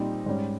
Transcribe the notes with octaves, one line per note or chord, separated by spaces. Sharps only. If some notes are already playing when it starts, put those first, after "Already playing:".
Already playing: A#2 G3 C4 D#4
G#2 G3 C#4